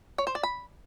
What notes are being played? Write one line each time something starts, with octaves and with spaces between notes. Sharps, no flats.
C#5
C5
D5
B5